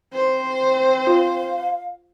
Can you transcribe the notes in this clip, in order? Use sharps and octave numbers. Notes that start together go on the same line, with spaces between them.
C4 C5
F4 F5